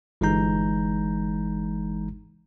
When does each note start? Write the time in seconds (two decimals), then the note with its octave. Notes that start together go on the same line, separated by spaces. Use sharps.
0.21 G1 E3 G#3 D#4 A#5 G6